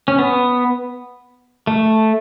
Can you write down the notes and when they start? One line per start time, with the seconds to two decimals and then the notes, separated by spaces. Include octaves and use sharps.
0.08 C#4
0.19 B3
1.67 A3